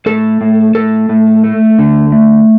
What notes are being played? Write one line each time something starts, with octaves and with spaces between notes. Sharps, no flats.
A2 A4
A2
A2 A4
A2
A3
D3
A3